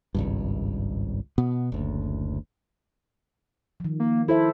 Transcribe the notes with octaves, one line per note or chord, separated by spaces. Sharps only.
G#1 C#2 G2
B2 B3
F#1 D2
D#3 F3
A#3
E4 A4 C5 E5